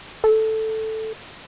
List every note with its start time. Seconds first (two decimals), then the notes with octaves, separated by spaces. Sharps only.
0.24 A4